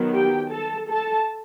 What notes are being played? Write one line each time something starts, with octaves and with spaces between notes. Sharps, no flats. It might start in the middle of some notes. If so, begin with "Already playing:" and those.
Already playing: D#3 F#3 B3
G4 G5
A4 A5
A4 A5